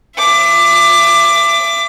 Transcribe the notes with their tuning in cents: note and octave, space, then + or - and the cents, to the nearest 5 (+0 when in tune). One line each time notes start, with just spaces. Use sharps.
E5 +30 D6 +10